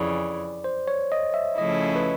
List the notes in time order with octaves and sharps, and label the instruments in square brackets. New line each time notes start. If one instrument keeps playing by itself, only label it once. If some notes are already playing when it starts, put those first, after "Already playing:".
Already playing: [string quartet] F2 C#3 E3 [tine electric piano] D5
[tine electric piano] C5
C#5
D#5
E5
[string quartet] C#3 F3 A3 C#4 E4 [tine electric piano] D#5
[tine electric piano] B4